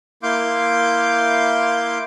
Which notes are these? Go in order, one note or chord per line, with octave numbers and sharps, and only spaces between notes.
A#3 E4 F5 C6 D6 G6